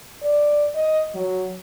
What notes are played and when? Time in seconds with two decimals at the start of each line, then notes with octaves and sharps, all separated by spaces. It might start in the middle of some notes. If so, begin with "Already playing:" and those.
0.23 D5
0.75 D#5
1.15 F#3